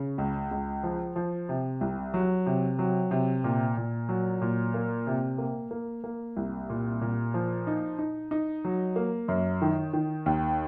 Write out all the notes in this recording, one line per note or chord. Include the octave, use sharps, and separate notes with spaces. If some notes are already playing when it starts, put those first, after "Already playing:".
Already playing: C#3
C#2
C#2
F3
F3
C3
C2
F#3
C3
F#3
C3
A#2
A#2
F#3
A#2
A#3
C3
A#3
A#3
A#3
C2
A#2
A#2
F3
D#4
D#4
D#4
F#3
A#3
F#2
D#3
D#3
D#2